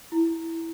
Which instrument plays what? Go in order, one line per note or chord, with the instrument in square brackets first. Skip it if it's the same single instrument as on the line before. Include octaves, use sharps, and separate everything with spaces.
[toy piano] E4